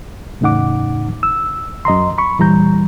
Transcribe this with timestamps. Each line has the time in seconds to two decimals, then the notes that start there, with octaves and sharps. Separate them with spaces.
0.41 E2 A2 C#3 D#4 F#5 D6
1.23 E6
1.85 F#2 D#5 A#5 C6
2.18 B5 C#6
2.38 E2 A#2 E3 G3 A#5 G6